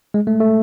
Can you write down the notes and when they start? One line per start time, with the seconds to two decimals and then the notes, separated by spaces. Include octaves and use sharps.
0.14 G#3
0.27 A3
0.40 A3